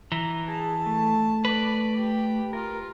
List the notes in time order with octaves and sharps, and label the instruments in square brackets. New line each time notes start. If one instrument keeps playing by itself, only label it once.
[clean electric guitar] E3 [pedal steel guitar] A#5
[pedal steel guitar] G#4 [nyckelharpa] A5
[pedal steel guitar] A3
[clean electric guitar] B4 [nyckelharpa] D5
[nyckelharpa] G4
[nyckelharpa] F4 [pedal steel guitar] A#4